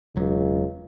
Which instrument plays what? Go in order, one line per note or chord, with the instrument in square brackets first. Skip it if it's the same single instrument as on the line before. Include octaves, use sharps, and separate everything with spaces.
[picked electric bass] E1 F#3 [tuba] C#2